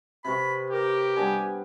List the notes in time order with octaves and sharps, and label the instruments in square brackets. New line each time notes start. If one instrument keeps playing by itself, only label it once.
[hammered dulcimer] C3 B4 C#6 [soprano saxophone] B5
[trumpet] G4 [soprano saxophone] A#4
[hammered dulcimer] G3 B3 D4 [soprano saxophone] G#5